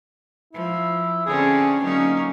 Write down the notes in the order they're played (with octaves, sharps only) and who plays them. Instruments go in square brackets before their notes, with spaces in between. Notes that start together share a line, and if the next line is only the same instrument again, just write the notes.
[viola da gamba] F3 [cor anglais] E4
[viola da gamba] D3 C4 C#4 [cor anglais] G#4
[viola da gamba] F#3 A#3 C#4 [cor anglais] D#4